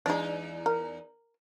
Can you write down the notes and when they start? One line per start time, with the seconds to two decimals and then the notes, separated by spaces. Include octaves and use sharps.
0.06 E2 G#3 D4 D#4
0.66 A#4